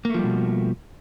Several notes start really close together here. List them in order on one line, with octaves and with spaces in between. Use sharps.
A#3 A3 F3 G3 B2